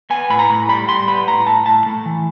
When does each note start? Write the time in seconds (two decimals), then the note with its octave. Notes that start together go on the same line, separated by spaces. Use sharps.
0.10 B3 G#5
0.30 A2 B5
0.39 A#5
0.50 A2
0.69 G3 B5
0.88 G3 C6
1.07 B3 B5
1.27 A2 A#5
1.47 A2 A5
1.66 A2 A5
1.86 A3
2.06 E3